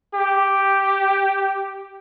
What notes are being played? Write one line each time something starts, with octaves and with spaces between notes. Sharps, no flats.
G4